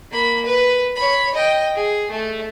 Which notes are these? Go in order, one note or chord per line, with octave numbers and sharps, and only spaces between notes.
A#3 B5
B4
C#5 B5
D#5 G5
G#4
A3